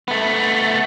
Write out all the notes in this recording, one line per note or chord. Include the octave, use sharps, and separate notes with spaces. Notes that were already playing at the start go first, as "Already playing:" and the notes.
A3 B3